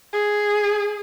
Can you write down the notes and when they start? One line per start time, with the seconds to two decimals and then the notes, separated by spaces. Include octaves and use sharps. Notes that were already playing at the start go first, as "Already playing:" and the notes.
0.13 G#4